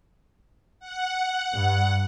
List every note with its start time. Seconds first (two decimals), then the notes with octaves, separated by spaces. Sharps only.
0.80 F#5
1.53 G2